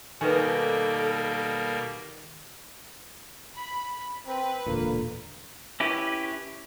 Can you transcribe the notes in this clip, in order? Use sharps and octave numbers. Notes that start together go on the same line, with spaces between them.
B2 D#3 G3 A#3 F#4 A4 B4 G#5
B5
C4 B4
E1 A#2 D3 A#3
C#4 E4 G4 B4